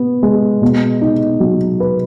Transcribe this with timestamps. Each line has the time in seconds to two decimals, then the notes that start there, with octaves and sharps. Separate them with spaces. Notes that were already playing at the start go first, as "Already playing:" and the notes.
Already playing: B3
0.23 G#3
0.62 B2
1.01 D#4
1.40 F#3
1.80 B4